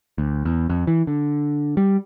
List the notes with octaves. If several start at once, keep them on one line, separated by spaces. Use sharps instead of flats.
D2
E2
F2
E3
D3
G3